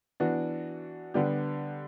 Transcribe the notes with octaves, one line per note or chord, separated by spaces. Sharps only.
E3 B3 D4 F#4
D3 G3 B3 D4 G4